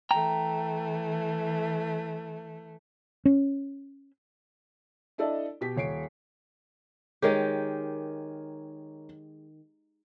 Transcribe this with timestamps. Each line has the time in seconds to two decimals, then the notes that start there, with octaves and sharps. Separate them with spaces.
0.11 E3 A3 G5 A#5
3.25 C#4
5.18 D4 E4 A4 D5 D#5
5.61 B2 G4 B6
5.77 D#1 C#5 C7 D7
7.22 D#3 G#3 G4 A#4 C#5